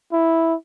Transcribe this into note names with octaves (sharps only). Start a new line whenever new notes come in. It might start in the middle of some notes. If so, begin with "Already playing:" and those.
E4